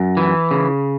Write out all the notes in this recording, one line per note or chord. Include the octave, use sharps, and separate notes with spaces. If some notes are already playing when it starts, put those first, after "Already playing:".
Already playing: F#2
E3
C#3